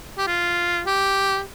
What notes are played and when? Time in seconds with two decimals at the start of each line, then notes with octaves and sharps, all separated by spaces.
0.18 G4
0.27 F4
0.86 G4